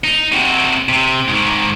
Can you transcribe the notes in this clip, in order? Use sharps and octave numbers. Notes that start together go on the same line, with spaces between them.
D#4
C3 F#4
C3
G#2 D#3